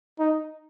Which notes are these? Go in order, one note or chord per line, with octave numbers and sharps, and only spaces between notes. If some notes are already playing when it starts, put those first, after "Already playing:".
D#4